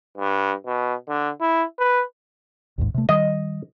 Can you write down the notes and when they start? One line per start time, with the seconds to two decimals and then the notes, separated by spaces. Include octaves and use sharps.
0.17 G2
0.66 B2
1.08 D3
1.41 E4
1.79 B4
2.78 A1 D#2 G#2
2.94 C3 A3
3.09 D#3 G3 D#5